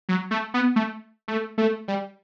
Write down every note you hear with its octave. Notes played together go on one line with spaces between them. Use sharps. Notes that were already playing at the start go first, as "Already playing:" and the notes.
F#3
A3
B3
A3
A3
A3
G3